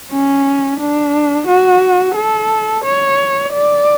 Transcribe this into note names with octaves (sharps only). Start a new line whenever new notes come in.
C#4
D4
F#4
A4
C#5
D5